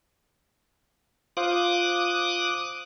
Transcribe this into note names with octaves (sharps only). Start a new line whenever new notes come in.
F4 C5 F5 D6 D#6 F#6